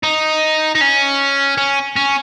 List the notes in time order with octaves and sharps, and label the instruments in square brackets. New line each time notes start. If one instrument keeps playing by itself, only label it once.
[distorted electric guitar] D#4
D#4
C#4
C#4
C#4